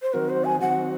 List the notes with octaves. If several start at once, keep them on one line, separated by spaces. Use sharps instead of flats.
C5
D#3 F#3 C4 F#4 A#4
C5
G#5
D#3 F#3 C4 F#4 F#5